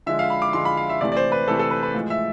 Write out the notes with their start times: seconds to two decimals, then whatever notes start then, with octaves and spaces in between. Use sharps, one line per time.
0.06 D3 F3 G#3 E5
0.19 F5
0.30 B5
0.42 D6
0.53 D3 F3 G#3 C6
0.65 B5
0.77 F5
0.89 E5
1.01 C3 E3 A3 D5
1.12 D5
1.17 C5
1.32 B4
1.48 C3 E3 A3 A4
1.59 A4
1.71 B4
1.83 B4
1.95 A2 F3 G#3
2.10 E5